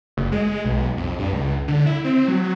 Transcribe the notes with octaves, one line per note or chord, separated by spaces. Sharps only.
F#1
G#3
G#3
B1
F2
G2
C#2
D3
E4
C4
F#3